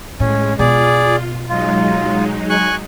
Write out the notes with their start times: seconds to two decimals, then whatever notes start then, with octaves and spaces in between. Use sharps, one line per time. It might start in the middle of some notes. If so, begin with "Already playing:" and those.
0.20 A2 G#3 C#4
0.59 B2 F4 G#4 D5
1.49 F#3 G#3 D#4 F4
2.50 G#5 C#6 F#6